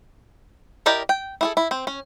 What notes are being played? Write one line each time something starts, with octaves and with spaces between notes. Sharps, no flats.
E4 G4 A#4 D5 D#5
G5
E4 G#4 A4
E4
C4
C#4